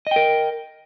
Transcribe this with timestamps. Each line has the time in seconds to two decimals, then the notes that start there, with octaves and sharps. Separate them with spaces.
0.07 D#5
0.11 G5
0.16 A#4